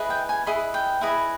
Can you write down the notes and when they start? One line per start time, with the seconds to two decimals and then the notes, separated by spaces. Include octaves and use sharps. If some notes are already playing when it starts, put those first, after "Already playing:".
Already playing: E4 G#4 B4 D#5
0.10 G5
0.29 G#5
0.47 E4 G#4 B4 D#5 B5
0.74 G5
1.01 E4 G#4 B4 D#5